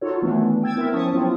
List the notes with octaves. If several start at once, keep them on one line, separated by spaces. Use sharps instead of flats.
D#4 F4 F#4 A4 C#5
D#3 E3 A3 B3 D4
G5 E6 G#6 A6
B3 C4 E4 A#4 E5
F3 C#4 A5 C#6 D#6
F3 F#3 B3 C4 E4 F4